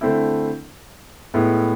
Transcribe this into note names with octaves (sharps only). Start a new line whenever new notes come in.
D3 A3 C4 E4
A2 G#3 B3 E4